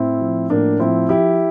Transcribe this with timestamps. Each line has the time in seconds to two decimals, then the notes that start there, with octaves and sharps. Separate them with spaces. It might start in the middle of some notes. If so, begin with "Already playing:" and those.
Already playing: A2 C4 E4
0.21 F3
0.50 A2 A#3 D4
0.79 F3 C4 E4
1.09 F3 E4 G4